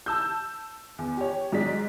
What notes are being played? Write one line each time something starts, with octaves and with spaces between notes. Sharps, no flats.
A5 E6 G6
E2
G4 C#5
G#2 F#3 G#4 D5 B6